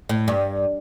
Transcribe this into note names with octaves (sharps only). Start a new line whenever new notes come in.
A2
G2